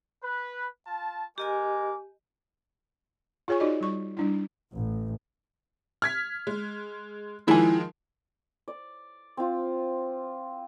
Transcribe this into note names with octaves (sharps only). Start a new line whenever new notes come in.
B4
F4 A5
G#3 G4 A#4 D#5 G#5 D6
F4 G#4 C#5 G#5 C#6
D#4 F#4 D5 D#5
G3 C#6
G3 D4 E4
A1
F6 G#6 B6
G#3
D#3 F3 G#3 E4 G#5
D5
C4 F4